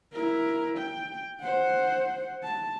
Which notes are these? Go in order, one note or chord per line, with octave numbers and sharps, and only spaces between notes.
E4 A#4
G5
C5 F#5
A5